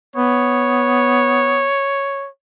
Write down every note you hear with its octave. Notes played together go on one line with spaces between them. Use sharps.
B3 C#5